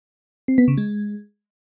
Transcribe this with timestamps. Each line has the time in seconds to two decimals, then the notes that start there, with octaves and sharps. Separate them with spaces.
0.48 C4
0.58 B3
0.68 C#3
0.78 G#3